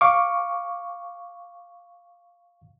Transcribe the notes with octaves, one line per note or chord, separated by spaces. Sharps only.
F5 C#6 D6